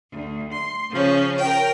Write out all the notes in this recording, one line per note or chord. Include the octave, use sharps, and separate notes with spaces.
D2
C6
C#3 F3 C#4
A#4 G5